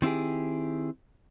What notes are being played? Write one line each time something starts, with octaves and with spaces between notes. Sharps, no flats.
D#3 C4 E4 G4 G#4